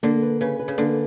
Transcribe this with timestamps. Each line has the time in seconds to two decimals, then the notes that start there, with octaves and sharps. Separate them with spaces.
0.03 D3 A#3
0.22 B4
0.41 C#3 B4
0.59 B4
0.68 C#3
0.78 D3 A#3